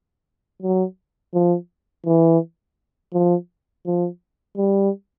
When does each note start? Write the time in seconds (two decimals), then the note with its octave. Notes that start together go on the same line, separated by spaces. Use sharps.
0.62 F#3
1.34 F3
2.06 E3
3.13 F3
3.86 F3
4.57 G3